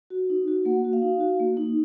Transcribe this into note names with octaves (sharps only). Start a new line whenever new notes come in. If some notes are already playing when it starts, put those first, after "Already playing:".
F#4
D#4
F#4
A#3 F#5
F#4
F5
D#4
F#4
A#3
D#4